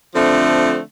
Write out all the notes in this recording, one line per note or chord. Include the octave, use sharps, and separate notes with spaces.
D3 F3 A3 C4